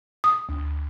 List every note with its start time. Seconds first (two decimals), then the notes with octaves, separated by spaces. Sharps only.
0.24 D#6
0.49 D2